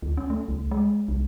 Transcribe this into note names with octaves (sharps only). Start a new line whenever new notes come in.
D2
C#4
A3
C#2
G#3
C2